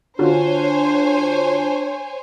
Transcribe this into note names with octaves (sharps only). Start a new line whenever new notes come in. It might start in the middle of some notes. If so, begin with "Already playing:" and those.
D3 D4 F4 F#4 C5 C#5 G#5